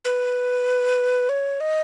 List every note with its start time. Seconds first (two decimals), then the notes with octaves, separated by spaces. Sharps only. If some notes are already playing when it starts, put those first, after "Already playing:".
0.05 B4
1.29 C#5
1.60 D#5